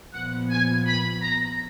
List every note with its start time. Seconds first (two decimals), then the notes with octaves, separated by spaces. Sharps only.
0.13 A#2 F3 B3 F#5
0.50 G#5
0.86 B5
1.22 A#5